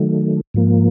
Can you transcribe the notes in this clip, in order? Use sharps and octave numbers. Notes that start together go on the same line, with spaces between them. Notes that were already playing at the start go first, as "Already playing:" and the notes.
Already playing: D#3 F#3 A3
G#2 F3 A#3